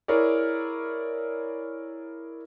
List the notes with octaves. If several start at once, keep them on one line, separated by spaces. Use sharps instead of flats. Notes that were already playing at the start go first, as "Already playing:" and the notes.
E4 G#4 A#4 C#5 D5